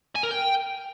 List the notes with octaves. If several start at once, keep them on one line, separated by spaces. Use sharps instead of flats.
G#5
A#4
G5